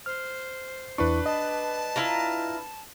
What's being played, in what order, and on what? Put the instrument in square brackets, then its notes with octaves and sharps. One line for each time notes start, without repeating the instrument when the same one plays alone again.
[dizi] C5 [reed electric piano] F6
[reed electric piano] E2 E4 C#6 [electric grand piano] D4 B4
[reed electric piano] D#5 [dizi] A5
[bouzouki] E4 F4 A#5